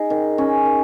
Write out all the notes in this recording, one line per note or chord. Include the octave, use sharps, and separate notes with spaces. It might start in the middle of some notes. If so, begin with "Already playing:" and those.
Already playing: D#4 G#4
D#3
C#4
D#3